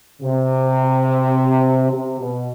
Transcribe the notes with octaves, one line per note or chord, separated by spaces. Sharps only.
C3
C3
B2